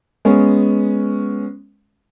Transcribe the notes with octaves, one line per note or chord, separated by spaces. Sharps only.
G#3 B3 C#4